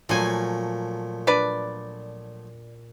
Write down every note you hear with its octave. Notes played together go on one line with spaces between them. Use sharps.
A#2 F3 F#3 A3 G#5
D4 B4 D5